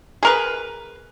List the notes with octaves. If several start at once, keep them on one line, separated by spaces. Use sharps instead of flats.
G#4 A#4 B4